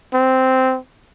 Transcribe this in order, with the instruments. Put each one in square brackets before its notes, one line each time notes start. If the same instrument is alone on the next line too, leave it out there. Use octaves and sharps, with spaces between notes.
[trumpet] C4